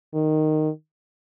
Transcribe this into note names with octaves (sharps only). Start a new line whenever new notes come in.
D#3